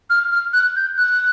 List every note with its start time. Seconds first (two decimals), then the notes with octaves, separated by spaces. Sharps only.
0.10 F6
0.32 F6
0.53 F#6
0.76 G6
0.98 F#6